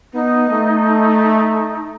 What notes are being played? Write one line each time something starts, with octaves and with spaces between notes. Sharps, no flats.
B3 D#4
A3